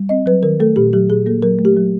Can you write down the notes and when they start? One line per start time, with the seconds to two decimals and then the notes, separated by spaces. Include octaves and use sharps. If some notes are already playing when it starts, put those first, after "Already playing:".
Already playing: G3
0.09 C4 D#5
0.26 F#3 B4
0.43 D#3 A#4
0.60 A3 A4
0.76 A#2 G4
0.93 F#3 G4
1.10 A#2 G#4
1.26 A#3 A4
1.42 F#3 A#4
1.59 A3
1.65 G4
1.77 F#3